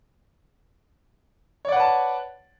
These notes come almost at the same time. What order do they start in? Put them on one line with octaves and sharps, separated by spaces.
C#5 D5 F#5 B4 A5